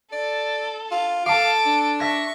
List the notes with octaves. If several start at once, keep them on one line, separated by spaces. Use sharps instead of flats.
A4 D5
F4
A4 F5 A5 D6 D7
D4
E5 C#6 A#6